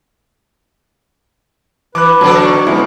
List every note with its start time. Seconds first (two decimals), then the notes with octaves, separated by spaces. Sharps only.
1.95 E3 B4 D6 F#6
2.21 B2 D3 F#3 D4 A4
2.45 D#4 C#6
2.66 F3 G#3 B3 C#4 E4